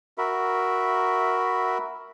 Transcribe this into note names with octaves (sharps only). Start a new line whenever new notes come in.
F#4 A#4 E5 B5